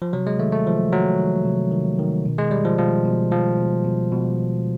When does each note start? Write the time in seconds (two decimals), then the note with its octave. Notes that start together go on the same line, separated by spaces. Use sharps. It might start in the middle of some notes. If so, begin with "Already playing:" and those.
0.02 F3
0.13 C3 F#3
0.27 G#3
0.39 D#3 A3
0.52 A3
0.66 D#3 F3
0.92 D#3 F#3
1.20 D#3
1.45 C3
1.72 D#3
1.99 D#3
2.26 B2
2.38 G#3
2.51 B2 G3
2.65 F3
2.79 B2 F3
3.04 B2
3.31 B2 F3
3.57 B2
3.84 B2
4.11 B2